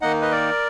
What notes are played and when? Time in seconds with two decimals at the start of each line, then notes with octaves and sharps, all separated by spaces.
0.01 D#3 A#3 D#4 D#5 F#5
0.21 B4 D#5
0.31 A#4 D5